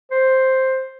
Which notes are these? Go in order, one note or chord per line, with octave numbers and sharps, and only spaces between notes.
C5